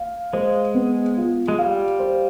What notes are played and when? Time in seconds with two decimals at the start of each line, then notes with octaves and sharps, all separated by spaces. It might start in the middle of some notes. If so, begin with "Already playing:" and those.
Already playing: F5
0.33 G#3 C5
0.74 B3
1.17 F4
1.48 G#3
1.58 G3 F5
1.99 C5